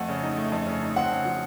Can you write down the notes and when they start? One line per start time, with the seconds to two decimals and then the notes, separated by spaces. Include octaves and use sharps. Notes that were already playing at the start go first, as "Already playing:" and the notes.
Already playing: F2 A3 F#5
0.08 C#3
0.23 D#4
0.37 A3
0.52 F2
0.67 C#3
0.82 D#4
0.96 C4 F#5
1.11 C#3
1.25 F3